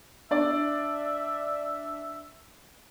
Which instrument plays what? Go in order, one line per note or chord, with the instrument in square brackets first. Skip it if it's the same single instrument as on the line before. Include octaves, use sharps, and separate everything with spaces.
[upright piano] D4 D5 [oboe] E5